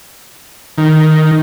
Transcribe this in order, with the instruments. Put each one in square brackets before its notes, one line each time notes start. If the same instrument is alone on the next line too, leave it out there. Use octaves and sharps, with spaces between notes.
[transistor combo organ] D#3